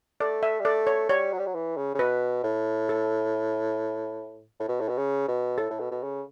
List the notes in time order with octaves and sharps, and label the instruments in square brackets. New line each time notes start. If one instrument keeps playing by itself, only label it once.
[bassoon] A3 [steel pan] D5
[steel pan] E5
[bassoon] G3
[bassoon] A3 [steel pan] D5
[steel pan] C#5
[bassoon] G3 [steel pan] C#5
[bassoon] F#3
G3
F#3
E3
C#3
C#3
[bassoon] B2 [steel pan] B4
[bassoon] A2
[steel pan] A4
[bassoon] A2
B2
A2
B2
C#3
B2
[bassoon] A2 [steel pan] A4
[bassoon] A2
B2
B2
C#3